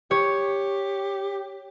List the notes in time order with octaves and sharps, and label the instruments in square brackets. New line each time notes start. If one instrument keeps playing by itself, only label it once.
[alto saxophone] G4 [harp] C#5